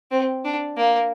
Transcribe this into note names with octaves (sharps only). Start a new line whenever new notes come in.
C4
D4
A#3